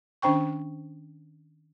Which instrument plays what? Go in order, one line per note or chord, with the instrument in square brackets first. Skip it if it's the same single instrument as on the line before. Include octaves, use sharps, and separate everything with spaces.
[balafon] D#3 C#4 D4 C5 G5 C#6